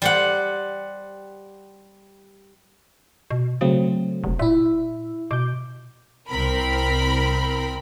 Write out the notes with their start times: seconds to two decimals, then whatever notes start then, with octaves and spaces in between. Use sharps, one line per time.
0.02 G3 C5 F#5
3.31 B2
3.61 C#3 F#3 A3 C4
4.24 F1
4.39 A#2 E4 E5
5.31 B2 D6 G6
6.29 C2 C4 A#4 B5